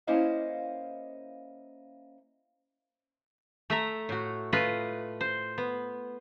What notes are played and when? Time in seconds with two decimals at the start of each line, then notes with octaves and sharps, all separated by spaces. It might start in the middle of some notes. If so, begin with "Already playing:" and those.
0.07 A#3 C#4 E4 C5 D#5 F5
3.70 A3 E5 A#5
4.09 A2 F#4
4.53 A3 F4 B4 D#5
5.21 C5
5.58 B3